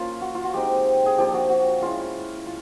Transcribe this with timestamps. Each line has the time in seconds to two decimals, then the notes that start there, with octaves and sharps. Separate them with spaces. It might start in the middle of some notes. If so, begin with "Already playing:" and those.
Already playing: A#3 C#4 F4
0.21 F#4
0.35 F4
0.44 F#4
0.54 G#3 C4 D#4 G4
1.06 G#4
1.18 F3 A#3 D4 F4 G4
1.34 F#4
1.50 F#4
1.81 G#3 C#4 E4 F4
2.46 F4